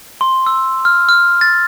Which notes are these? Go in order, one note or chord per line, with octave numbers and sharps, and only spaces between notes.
C6
E6
F6
F6
A6